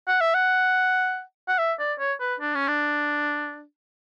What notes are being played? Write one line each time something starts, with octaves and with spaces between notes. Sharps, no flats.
F#5
E5
F#5
F#5
E5
D5
C#5
B4
D4
C#4
D4